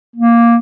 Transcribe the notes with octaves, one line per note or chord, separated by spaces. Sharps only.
A#3